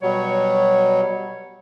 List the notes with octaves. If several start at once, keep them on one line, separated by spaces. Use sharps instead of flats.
B2 F#3 G3 C#5